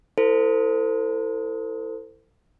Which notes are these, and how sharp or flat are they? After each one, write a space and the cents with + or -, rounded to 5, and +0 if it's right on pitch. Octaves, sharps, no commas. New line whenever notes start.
E4 +0 A4 +35 C5 -30